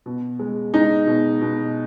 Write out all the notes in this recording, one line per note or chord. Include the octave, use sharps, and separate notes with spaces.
B2
G#3
G#3 D#4
B2
B2